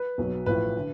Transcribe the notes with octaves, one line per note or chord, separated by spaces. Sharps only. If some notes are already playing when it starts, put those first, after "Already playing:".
Already playing: B4
B1 B2 F#3
A1 A2 F3 B4
D3